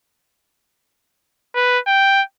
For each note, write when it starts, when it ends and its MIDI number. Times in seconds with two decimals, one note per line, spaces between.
1.55 1.79 71
1.87 2.22 79